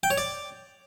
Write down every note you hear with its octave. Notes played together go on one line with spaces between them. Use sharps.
G5
C#5
D5